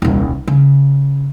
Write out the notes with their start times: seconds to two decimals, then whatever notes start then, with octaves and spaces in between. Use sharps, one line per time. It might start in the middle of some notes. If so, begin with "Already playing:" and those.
0.02 D#1 C2
0.47 C#3